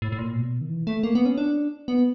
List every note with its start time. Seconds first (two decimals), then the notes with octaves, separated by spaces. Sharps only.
0.02 A2
0.12 A2
0.18 A#2
0.36 B2
0.61 D#3
0.69 E3
0.87 A3
1.03 A#3
1.15 B3
1.26 C#4
1.38 D4
1.88 B3